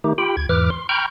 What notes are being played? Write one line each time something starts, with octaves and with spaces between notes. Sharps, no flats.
D#3 A3 D#4 G4
F4 G4 G5 B5
D2 G#6
E2 G#2 E3 B4 D6 F6
C6
G5 A#5 B5 C#6 F6 G6